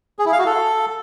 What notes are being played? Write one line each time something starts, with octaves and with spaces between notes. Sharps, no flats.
G#4
E4
F5
F#4
A4